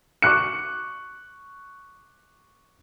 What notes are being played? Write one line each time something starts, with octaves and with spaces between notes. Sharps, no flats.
C#6 D6 F#6 C#7